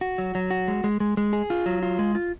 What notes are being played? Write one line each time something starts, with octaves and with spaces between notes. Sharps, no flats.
F#4
F#3
F#3
F#4
G#3
G#3
G#3
G#3
G#4
F4
F#3
F4
G#3
F4